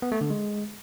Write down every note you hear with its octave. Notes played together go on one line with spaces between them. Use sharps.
B3
A3
D3
G#3